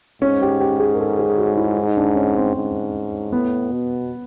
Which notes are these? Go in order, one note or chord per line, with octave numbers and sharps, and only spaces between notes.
G#2 C#4
G4
G4
G#4
A#4
A4
G#4
F#4
E4
D#4
D4
C#4
C4
G#2
A2 B3
B2